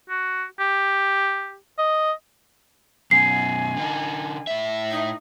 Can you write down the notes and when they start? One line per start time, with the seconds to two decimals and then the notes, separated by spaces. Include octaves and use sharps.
0.10 F#4
0.60 G4
1.78 D#5
3.11 F#2 B2 G#5 C7
3.76 D3 D#4
4.47 A2 E5
4.90 D#4